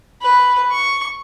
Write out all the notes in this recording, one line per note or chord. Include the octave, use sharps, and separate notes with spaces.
B4
C#6